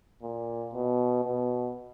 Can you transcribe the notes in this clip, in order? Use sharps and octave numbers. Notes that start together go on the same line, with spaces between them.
A#2
B2
B2